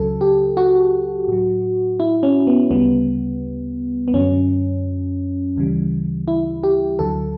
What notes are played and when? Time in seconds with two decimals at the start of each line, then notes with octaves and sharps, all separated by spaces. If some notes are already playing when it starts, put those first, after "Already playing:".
Already playing: C#2 C#3 F#3 A4
0.21 G4
0.57 F#4
1.28 A2 F#3
2.00 E4
2.23 C#4
2.47 B3
2.71 D2 C#3 G3 B3
4.08 B3
4.14 F#2 D3 F#3 C#4
5.57 D2 C#3 E3 G3
6.28 E4
6.63 G4
6.99 D2 D3 F#3 A4